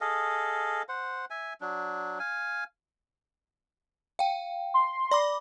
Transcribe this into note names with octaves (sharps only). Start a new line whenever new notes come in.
G#4 A4 D#5 F5
C5 F#5
E5 G#5
F#3 D4
F5 G#5
F5 G5
C6
D5 B5 D6